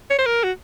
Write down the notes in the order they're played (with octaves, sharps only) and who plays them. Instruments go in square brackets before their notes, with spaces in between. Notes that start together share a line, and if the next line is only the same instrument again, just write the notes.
[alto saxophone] C#5
C5
A#4
F#4